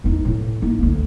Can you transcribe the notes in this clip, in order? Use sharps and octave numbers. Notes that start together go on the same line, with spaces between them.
E2 D#4
A2 E3
A#3 D#4
D2 A#3